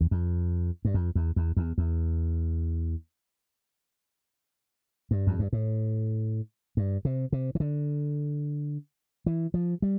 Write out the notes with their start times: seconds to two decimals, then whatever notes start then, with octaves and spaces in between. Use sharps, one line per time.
0.01 E2
0.11 F2
0.85 G2
0.94 F2
1.15 E2
1.36 E2
1.57 E2
1.78 E2
5.11 G2
5.27 F2
5.39 G2
5.53 A2
6.77 G2
7.05 C3
7.33 C3
7.55 E3
7.60 D3
9.26 E3
9.54 F3
9.82 G3